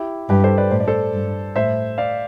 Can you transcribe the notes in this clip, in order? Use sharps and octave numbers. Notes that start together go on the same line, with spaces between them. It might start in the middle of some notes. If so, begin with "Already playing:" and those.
Already playing: E4 G4
G2 G4 B4
A4 C5
B4 D5
A2 C5
D5
A4 C5
G2
A2 C5 E5
D5 F5